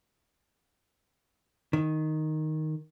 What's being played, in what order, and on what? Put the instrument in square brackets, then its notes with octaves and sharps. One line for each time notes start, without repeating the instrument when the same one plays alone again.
[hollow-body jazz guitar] D#3